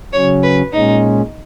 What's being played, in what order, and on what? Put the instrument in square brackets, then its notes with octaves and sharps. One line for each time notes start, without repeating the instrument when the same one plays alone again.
[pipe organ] C#3 F#3 C#4 [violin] C#5
[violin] B4
[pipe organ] A#2 G#3 C#4 [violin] D#4